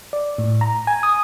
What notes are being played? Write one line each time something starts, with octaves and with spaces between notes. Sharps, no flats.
D5
A2
A#5
G#5
D#6